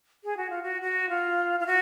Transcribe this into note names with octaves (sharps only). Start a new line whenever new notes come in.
G#4
F#4
F4
F#4
F#4
F4
F4
F#4